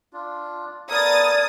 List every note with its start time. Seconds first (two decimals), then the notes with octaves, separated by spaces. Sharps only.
0.13 D4 F4
0.90 B3 A4 A#4 D5 A#5 D#6 G#6 A6